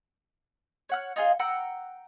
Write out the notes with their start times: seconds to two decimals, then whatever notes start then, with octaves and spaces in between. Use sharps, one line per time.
0.89 C#5 F#5 F6
1.16 D#4 F4 G#4 F5
1.39 F#5 G5 A#5 E6